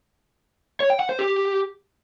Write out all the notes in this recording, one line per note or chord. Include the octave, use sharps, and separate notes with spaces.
C#5
G5
F#5
C5
G4